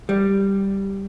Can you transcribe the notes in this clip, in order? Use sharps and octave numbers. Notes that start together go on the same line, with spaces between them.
G3